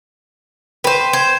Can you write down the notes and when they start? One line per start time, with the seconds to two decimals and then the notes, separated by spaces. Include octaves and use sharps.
0.84 B4 C5 G5
1.13 C5 G#6